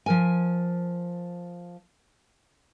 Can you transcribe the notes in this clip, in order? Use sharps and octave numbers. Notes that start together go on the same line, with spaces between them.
F3 A#4 G#5